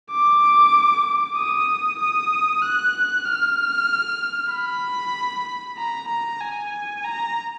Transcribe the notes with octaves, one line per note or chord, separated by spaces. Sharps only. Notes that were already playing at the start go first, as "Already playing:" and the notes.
D6
D#6
D#6
F#6
F6
B5
A#5
A#5
G#5
A#5